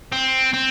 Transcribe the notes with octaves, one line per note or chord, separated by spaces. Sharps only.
C4
C4